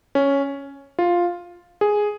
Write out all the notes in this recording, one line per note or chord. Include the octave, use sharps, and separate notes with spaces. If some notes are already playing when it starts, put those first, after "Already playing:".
C#4
F4
G#4